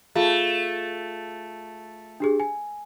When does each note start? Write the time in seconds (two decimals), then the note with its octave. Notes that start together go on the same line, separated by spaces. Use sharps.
0.15 A3 F4 G#4 F5
2.20 D4 G4 G#4
2.40 G#5